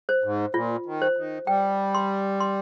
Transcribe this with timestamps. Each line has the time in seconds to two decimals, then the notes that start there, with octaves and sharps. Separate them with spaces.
0.09 C5
0.24 G#2
0.54 A#2 F4
0.86 D#3
1.02 C5
1.17 D#3
1.47 G3 G5
1.95 C6
2.40 C6